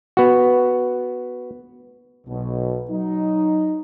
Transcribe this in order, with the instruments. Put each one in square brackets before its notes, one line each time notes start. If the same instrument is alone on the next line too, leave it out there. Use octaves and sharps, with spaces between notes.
[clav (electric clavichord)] B3 F#4
[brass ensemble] B1 B2
F#3 D#4